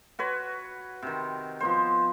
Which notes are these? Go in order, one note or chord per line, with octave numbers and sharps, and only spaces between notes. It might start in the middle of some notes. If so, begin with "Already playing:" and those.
F#4 B4 C#5
C3 D#3
F3 B3 C5